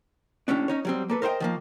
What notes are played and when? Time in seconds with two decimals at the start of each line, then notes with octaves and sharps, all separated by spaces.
0.48 D#2 A2 C#4 D4
0.68 C#4 D#4 C#5
0.85 F#3 G3 C4
1.09 A#3 A4 B4
1.22 A#4 C5 D#5 F5 G5
1.40 D#3 F3 A#3